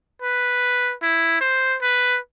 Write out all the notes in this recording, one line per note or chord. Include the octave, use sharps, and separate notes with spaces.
B4
E4
C5
B4